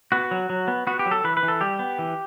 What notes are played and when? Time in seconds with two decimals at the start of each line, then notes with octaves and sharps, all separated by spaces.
0.12 B3 F#4
0.31 F#3
0.50 F#3
0.68 B3
0.87 B3 F#4
0.99 G4
1.06 F#3
1.11 A4
1.24 E3 B4
1.37 B4
1.43 E3
1.48 A4
1.61 G3 G4
1.79 B3
1.99 E3